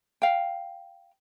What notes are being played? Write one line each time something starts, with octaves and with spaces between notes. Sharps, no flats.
F5 G5